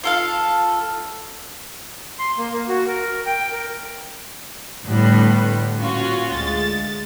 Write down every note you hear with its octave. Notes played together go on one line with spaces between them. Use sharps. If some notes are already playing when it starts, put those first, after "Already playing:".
F4 A4 F5
C6
A#3
A#3
F#4
A#4
G5
A#4
A2 D3 G3 B3
A#2 C#4 F4 F#4
D2 G#3 A6